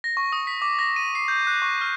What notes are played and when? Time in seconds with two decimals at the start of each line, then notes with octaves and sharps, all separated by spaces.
0.04 A#6
0.17 C#6
0.32 D#6
0.47 B6
0.62 D6
0.79 A#6
0.96 D#7
1.15 C7
1.28 G6
1.47 F#6
1.62 C#6
1.81 F6